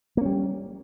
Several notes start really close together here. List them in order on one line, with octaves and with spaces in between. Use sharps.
A#3 C#4 G3